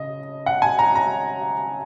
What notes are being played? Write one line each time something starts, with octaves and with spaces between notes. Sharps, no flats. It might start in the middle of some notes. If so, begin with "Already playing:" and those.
Already playing: C#3 D#5
F#5
G#5
A#5
A#5